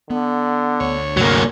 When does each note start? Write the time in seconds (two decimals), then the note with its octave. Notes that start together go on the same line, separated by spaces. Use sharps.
0.10 D3 B3
0.80 D2 C#5
1.17 G2 C3 F#3 A3 A#3